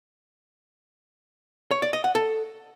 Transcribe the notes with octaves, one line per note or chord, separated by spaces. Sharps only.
C#5
D5
D#5
F#5
A4